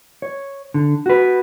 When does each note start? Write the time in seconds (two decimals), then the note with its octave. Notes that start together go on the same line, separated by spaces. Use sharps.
0.22 C#5
0.74 D3
1.06 F#4 B4